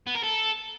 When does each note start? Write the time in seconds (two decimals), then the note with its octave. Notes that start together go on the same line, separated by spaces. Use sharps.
0.07 B3
0.15 A#4
0.23 A4